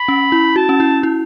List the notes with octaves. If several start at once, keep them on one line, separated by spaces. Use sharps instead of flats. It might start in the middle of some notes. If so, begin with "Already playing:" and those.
Already playing: B5
C#4
E4
F#4 A5
C#4
E4
E4